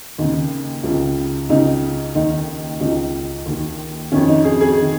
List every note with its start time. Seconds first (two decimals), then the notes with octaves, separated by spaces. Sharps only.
0.18 D#2 C#3 D#4
0.84 C#2 C#3
1.49 C#2 C#3 D#4
2.15 D#2 D#3 D#4
2.81 C#2 C#3 D#4
3.46 D#2 D#3
4.12 F2 D#3 C#4
4.28 D#4
4.44 G#4
4.61 G#4
4.81 D#3